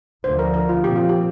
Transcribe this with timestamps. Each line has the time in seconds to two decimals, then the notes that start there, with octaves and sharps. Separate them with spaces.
0.24 D2 D3 F3 C5
0.39 A#4
0.54 A#4
0.69 F4
0.84 A#2 F3 C4 G4
0.96 F4
1.09 G4